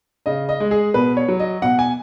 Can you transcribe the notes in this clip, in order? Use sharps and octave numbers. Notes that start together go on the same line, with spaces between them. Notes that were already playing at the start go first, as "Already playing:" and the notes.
C#3 D#5
D#5
G#3
G#4
B2 B4
C#5
F#3
D#5
B2 F#5
G#5